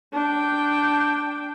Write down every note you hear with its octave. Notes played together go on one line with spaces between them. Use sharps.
D4 G5